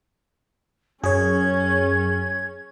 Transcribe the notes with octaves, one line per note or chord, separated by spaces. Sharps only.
F#2 C#4 G#4 C#5 G#6